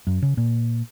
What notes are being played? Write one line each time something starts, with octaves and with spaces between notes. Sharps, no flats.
F#2
C#3
A#2